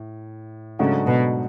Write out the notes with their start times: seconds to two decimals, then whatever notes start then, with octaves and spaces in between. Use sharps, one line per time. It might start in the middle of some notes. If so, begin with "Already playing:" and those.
Already playing: A2
0.79 G#2 C#3 F#3 A3 D4 F#4
1.08 B2